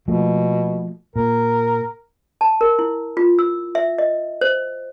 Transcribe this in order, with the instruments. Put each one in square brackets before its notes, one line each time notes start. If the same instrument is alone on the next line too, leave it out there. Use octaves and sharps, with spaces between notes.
[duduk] B2 [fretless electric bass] F3 A3 A#3
[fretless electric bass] A#2 [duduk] A#4
[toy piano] A5
A#4
E4
F4
E6
E5
D#5
C5